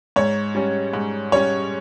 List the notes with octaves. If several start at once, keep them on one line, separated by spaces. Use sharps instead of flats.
G#2 C#5
G3 C#4
G#2
G3 C#4 C#5